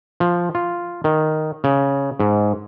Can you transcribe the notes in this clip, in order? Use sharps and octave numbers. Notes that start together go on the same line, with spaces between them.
F3
F4
D#3
C#3
G#2